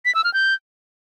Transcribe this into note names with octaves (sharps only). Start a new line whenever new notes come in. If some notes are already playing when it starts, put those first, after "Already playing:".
B6
E6
F6
G6